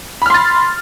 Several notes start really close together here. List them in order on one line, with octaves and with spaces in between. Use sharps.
B5 F6 C6 A6